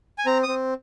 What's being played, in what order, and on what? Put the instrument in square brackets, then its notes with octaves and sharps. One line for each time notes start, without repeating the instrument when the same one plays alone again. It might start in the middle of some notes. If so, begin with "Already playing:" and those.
[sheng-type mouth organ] G#5
C4 A#5
C4 D#6